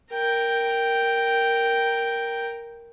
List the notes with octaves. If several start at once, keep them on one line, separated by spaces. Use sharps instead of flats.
A#4 G5